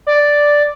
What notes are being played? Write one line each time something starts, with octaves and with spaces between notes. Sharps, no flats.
D5